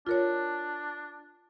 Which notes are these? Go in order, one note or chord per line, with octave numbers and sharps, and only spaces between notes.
D4 F4 A#4 C#5